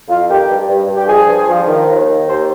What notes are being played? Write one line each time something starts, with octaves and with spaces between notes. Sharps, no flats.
F2 F4
D#3 G4
G2
G2
G2
G4
F3 G#4
G2
F3
D#3
D#2
D#3
D#2 C5